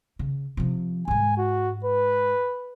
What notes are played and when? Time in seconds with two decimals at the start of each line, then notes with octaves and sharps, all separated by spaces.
0.19 C#3
0.57 C3 F3
1.08 G#2 G#3 G#5
1.37 F#4
1.85 B4